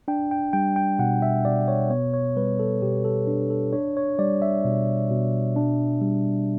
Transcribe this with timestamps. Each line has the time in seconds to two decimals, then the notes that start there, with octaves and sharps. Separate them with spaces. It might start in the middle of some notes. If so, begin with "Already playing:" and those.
0.08 D4 G5
0.31 G5
0.53 G3 G5
0.76 G5
0.99 B2 F#5
1.22 E5
1.45 B2 D5
1.68 C#5
1.90 B3 C#5
2.14 C#5
2.36 G3 B4
2.60 A4
2.82 B2 G4
3.04 A4
3.27 D4
3.50 A4
3.73 D4 C#5
3.97 C#5
4.19 G3 D5
4.42 E5
4.65 B2
5.10 B2
5.56 D4
6.01 G3